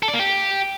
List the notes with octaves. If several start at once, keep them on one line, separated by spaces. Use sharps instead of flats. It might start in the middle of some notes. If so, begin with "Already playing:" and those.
A4
D5
A#3
G4